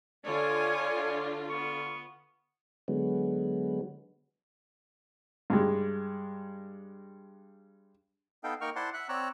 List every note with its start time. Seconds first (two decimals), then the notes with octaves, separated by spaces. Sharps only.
0.25 D3 F4 C#5 D5 G#5
1.49 B3 C#6
2.88 D3 F#3 G#3 B3
5.50 G2 G#3
8.44 B3 D#4 A4 F5 G5
8.61 A#3 D#4 A#4 G5 C#6 F6
8.76 E4 C5 D5 F#5 A5 C6
8.94 E5 F#5 F#6
9.09 C4 C#5 D5 A#5 E6 F#6